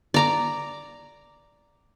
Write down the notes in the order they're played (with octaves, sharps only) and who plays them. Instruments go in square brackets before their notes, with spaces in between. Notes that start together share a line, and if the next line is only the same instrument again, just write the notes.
[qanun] D5 A#5 D6